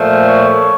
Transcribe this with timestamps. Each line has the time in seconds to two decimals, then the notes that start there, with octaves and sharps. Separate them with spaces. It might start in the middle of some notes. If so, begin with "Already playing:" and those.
Already playing: A#2 F3 A3
0.25 C#5